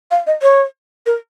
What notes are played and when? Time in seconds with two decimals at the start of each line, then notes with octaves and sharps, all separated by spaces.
0.11 F5
0.27 D#5
0.42 C#5
1.06 A#4